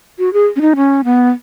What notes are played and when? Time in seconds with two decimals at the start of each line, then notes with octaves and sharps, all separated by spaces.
0.19 F#4
0.33 G#4
0.56 C#4
0.61 D#4
0.76 C#4
1.04 B3